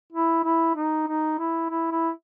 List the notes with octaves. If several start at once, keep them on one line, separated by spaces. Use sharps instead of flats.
E4
E4
D#4
D#4
E4
E4
E4